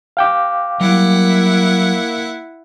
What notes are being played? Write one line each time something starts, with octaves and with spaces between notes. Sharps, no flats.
F5 G5 D6
F#3 G3 A#3 E4 F#5